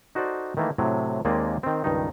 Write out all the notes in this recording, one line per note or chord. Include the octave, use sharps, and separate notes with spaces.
D#4 F#4 A4 C5 D5
D#3 E3 A3 A#3
A2 C3 F#3
D#2 G#3 A#3 C4 D5 G#5
D#3 C4
C#2 G2 D#3 D#4